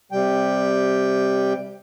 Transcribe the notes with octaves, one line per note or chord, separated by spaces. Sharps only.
C3 G3 G5